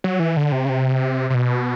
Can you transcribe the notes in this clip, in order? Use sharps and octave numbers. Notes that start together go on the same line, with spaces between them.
F#3
E3
D3
C3
C#3
C3
C3
B2